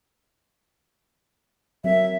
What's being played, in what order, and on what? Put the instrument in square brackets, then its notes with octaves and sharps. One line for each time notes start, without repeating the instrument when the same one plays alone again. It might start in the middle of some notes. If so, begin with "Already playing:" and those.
[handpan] F#3 C4 A#4 [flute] E5